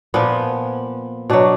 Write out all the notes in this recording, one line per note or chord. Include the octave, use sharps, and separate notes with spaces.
A#2 F3 B3
B2 F#3 D4